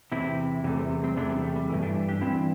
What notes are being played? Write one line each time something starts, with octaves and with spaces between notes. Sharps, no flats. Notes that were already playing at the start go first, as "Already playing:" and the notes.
E2 C3 E3 C4 E4
E2 C3 E3 A3
G3 C4
A3
G3 C4
E2 C3 E3 A3 D4
G3 C4
A3
G3
G2 E3 A3
A3 D4
D4 G4
G2 E3 C4 E4